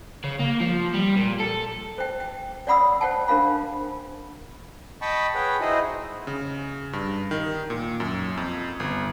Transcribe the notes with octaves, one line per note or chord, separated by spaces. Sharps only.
C#3
A#3
F3
G3
A#2
A4
C5 G5
G5
C#5 D5 F#5 B5 D#6 E6
C5 C#5 F#5 G5 A5
D4 A#4 C5 F5 B5
D#5 G5 A5 B5 C#6
G#4 B4 C#5 F#5 G5
D#4 E4 F#4 G#4 C5 D#5
C#3
G2
D#3
A#2
F#2
F2
G1